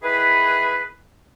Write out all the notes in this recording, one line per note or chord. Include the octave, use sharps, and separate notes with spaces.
D#3 E3 E4 G#4 B4